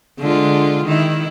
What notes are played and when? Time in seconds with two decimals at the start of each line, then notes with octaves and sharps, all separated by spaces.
0.20 D3 G#3 F4
0.85 D#3 E4